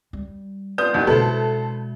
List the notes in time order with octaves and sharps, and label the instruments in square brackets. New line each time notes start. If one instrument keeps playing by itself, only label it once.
[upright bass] G3
[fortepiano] B3 F4 D#6 [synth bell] D5 [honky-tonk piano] G6
[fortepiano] D#2 D#3 [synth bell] C#4 E4
[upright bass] B2 G#3 [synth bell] F#4 E5 [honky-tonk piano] A4 [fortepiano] B4 C5